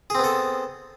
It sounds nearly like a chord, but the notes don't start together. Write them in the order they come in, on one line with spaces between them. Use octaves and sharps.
G#4 C4 B3 A4